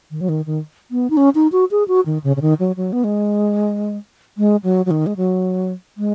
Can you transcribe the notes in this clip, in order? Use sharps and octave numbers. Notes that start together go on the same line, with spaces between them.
D#3
F#3
D#3
D#3
B3
D#4
C#4
D#4
F#4
G#4
F#4
D#3
C#3
C#3
D#3
F#3
F#3
B3
G#3
G#3
F#3
F#3
D#3
G#3
F#3
G#3